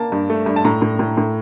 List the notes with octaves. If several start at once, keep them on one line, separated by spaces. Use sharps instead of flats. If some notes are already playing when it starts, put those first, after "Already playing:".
Already playing: A#3 A5
G2
A3
G2
A5
A2 A#5
A2
A2
A2